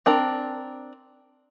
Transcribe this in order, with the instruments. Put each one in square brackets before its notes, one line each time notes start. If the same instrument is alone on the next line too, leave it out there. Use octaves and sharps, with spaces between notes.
[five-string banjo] C4 D4 A#4 A#5